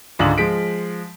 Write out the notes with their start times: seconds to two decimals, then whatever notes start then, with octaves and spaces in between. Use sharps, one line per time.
0.19 C#2 G#2 D3 F#7
0.38 F3 G#3 B6 D7